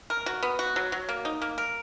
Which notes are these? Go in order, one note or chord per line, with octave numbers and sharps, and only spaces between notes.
A#4
F#4
B3
F#4
F#3
F#3
A#3
D#4
A#3
A#4